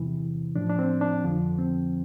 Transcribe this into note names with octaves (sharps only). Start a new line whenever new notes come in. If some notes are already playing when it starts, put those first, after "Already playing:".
Already playing: E2 C3 E3 E4
A2 F3 D4
D4
C4
D4
F2 D3 F3
C4